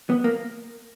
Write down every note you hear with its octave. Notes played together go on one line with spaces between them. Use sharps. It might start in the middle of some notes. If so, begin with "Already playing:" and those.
B3
A#3